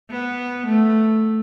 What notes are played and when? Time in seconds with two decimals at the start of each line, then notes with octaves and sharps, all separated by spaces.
0.10 B3
0.66 A3